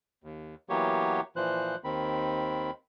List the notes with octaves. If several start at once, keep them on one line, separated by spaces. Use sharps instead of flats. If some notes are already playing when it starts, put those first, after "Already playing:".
D#2
E3 F#3 A#3 B3 G4 C#5
A#2 E3 F3 C5 F#6
D#2 D#3 C4 B5